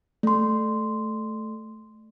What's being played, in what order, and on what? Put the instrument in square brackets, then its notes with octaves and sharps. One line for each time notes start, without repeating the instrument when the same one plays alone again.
[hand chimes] A3 C6